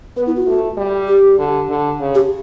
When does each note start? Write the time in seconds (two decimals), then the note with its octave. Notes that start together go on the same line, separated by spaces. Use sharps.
0.16 B3 B4
0.27 E4
0.36 F#4
0.47 A3
0.77 G3
1.08 G4
1.38 D3
1.69 D3
2.00 C#3
2.15 G4